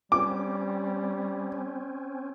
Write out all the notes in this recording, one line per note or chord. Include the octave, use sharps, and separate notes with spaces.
G3 C4 C#4 D6